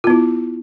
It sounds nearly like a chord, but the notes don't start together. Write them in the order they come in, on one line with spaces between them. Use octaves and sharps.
F4 B3 E4